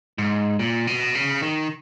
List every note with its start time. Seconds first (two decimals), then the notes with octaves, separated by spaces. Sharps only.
0.18 G#2
0.59 A#2
0.87 B2
1.15 C#3
1.42 D#3